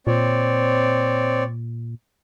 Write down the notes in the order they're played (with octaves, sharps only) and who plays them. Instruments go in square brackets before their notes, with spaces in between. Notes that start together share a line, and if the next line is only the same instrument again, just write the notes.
[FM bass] A#2 [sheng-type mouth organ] C4 C#5 D5